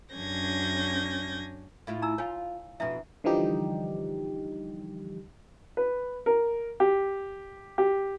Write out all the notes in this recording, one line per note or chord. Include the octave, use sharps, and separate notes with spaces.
F#2 C#4 D4 G6 G#6 A#6
A2 E4 F4
D#4 A#5 E6
F4 C#5 F5 G#5
F2 B2 D4 E4 E5
D3 E3 F3 G3 D#4 G4
B4
A#4
G4
G4